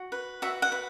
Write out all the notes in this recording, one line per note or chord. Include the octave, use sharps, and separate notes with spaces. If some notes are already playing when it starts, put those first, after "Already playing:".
Already playing: F#4
B4
F#4 E5
F#5
B4